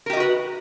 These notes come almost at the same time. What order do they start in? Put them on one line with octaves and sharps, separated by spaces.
A#4 G4 D#5 F#4 B4